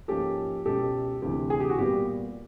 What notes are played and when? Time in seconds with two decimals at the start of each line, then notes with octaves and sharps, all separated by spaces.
0.08 G#2 F3 A#3 C#4 G4 A4
0.65 C#2 B2 G#3 C#4 G4 A4
1.22 D2 C3 E3 G4
1.50 G#4
1.60 G4
1.69 F#4
1.78 A#2 G3 B3 G4